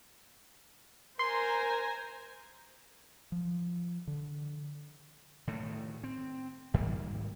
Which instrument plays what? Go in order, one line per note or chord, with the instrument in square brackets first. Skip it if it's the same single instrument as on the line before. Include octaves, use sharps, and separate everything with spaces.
[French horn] A#4 [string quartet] C5 G#5 A#5 [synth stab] C6
[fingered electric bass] F3
D3
[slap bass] A2 D#3 A3
C4
G#2 D#3 G3 A#3